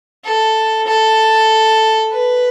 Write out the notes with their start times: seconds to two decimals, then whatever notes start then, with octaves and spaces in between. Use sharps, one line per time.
0.24 A4
0.87 A4
2.11 B4